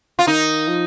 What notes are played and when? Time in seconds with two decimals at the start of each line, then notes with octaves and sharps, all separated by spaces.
0.19 F4
0.27 D#3 D#4
0.68 F3